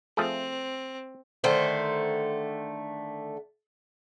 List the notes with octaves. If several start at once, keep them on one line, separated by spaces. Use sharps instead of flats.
F3 A3 C4 G#4
D3 D#3 A3 C5